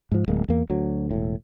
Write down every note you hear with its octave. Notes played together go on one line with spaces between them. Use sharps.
G#2 F3
D1 G#3 A#3
E2 A#3
D2 F#3
E1 A2